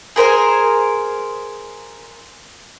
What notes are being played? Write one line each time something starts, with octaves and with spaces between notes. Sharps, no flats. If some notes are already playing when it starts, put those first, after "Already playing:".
G#4 A#4 C5 G#5